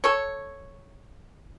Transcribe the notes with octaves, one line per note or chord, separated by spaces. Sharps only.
A4 C#5